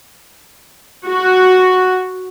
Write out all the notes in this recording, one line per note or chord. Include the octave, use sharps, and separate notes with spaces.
F#4